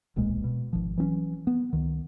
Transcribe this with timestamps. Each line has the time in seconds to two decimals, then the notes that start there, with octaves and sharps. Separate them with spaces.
0.16 D1 B1 A#2 G#3
0.44 B2
0.73 G#1 F3
0.97 E3 F#3 C4 C#4
1.47 B3
1.73 C#2 D#3